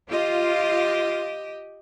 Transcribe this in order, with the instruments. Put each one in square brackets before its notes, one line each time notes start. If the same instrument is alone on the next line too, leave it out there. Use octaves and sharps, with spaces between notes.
[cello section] F4 [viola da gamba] G4 D#5